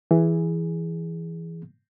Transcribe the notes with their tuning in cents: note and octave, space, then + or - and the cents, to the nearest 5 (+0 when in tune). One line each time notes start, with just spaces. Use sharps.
E3 +5 G#4 +0